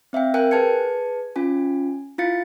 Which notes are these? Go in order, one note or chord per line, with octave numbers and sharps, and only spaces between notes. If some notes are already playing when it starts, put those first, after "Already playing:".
C4 E5 F5 G5
A#4 G5 G#5 F#6
G#4 B4 A5 G#6 C#7
C#4 F4 G#5
E4 F4 F5 A6 C#7